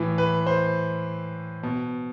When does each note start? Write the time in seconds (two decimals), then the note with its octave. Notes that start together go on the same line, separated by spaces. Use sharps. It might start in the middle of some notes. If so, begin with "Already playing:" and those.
Already playing: A2 E3
0.18 B4
0.47 C5
1.63 B2